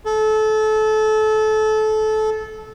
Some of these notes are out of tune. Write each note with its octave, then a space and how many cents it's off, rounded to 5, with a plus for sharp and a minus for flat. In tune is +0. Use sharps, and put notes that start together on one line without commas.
A4 -25